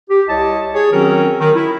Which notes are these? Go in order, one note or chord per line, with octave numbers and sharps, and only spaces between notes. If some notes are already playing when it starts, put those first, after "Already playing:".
G4
C2 E4 C#5 D#5 A5
G#4 C#5
D#3 F#3 C4 C#4 F#4 A#4
D#3
E4